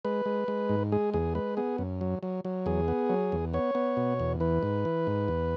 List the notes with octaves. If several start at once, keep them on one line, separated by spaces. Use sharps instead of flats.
G#3 B4
G#3
G#3
G#2
G#3 G#4
E2 G#4
G#3 B4
B3 G#4
F#2
F#3
F#3
F#3
E2 G#4
B3
F#3
E2
B3 C#5
B3
B2
E2
E3 B4
G#2
E3
G#2
E2